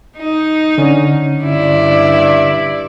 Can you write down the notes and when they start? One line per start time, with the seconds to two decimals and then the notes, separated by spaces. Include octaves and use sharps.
0.17 D#4
0.78 D3 C#4
1.44 G2 E4 D5